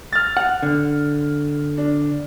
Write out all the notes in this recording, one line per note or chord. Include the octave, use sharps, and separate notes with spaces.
F6 A6
F#5
D3
D4